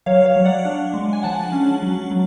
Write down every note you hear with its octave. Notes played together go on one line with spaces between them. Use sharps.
F#3 C#5 F5
C#5 F5
F#3
D5 F#5
D4
G#3
G#5
F3 F#5 A5
C#4
F#3
F#3